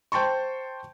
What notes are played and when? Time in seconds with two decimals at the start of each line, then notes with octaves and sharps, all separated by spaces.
0.12 C5 G5 A5 C6 C#6